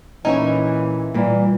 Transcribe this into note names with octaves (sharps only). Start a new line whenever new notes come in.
A#2 E3 C#4 D#4 E4 C#5 G#5
A#2 E3 G3 D5